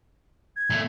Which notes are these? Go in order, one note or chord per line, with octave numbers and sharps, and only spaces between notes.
G#6
A#2 A3